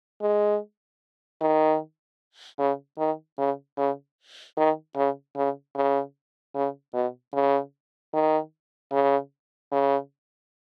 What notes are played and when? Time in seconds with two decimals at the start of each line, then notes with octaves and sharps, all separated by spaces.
0.22 G#3
1.41 D#3
2.59 C#3
2.98 D#3
3.38 C#3
3.78 C#3
4.58 D#3
4.96 C#3
5.37 C#3
5.76 C#3
6.55 C#3
6.94 B2
7.34 C#3
8.14 D#3
8.92 C#3
9.72 C#3